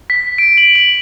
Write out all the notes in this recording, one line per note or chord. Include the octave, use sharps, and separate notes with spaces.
B6
D7
F#7
F#7